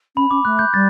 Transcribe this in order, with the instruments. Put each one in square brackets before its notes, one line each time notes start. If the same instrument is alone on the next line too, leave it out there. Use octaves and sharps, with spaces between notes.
[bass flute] C#4 [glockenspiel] B5
[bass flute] C#4 [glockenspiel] D6
[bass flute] A3 [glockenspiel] F#6
[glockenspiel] G6
[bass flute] G3 [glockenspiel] A6